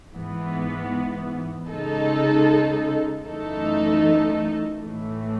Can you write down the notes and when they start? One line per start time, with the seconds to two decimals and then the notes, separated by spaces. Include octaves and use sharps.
0.12 G#2 E3 B3
1.69 C#3 G#3 D#4 A4
3.25 F#2 E3 A3 D#4 A4
4.83 A2 E3 A3